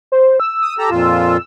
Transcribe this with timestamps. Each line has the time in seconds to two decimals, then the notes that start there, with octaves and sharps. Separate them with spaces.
0.12 C5
0.40 E6
0.63 D#6
0.78 G4 A4 A#5
0.91 F2 A#2 F4